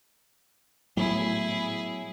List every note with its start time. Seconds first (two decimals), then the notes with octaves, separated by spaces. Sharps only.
0.97 A2 F#3 B3 E4 G#4